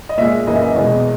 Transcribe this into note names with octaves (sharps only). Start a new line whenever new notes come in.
D#5
A#2 G#3 E5
F#2 E3 A#3 D#5
E5
D#5
E2 B2 G#3 D#5